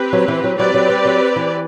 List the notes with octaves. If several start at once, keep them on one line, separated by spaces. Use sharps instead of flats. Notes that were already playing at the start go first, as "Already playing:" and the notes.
Already playing: C4 G4 B4
F#3
E3
F#3
F#3 C4 G4 B4 D5
F#3
G3
F#3
E3